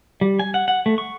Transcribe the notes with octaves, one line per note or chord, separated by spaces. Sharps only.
G3
G#5
F#5
F#5
A3
C#6